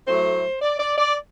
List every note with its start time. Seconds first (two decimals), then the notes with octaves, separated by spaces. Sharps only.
0.07 A2 F#3 A3 C5
0.62 D5
0.80 D5
0.98 D5